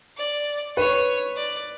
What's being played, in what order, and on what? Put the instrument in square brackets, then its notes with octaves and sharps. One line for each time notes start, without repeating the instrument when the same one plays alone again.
[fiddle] D5
[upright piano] B4 [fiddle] C#5
[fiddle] D5